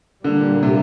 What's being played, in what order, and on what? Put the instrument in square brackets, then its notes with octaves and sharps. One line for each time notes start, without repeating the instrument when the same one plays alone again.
[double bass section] A#2 G3 A#3 [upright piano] D3
[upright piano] C3